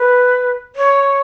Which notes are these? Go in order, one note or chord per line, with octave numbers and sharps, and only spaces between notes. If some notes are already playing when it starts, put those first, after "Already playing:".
Already playing: B4
C#5